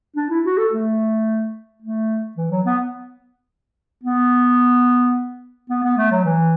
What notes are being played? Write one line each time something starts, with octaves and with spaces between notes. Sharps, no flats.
D4
E4
F#4
A4
A3
A3
E3
F#3
B3
B3
B3
B3
A3
F#3
E3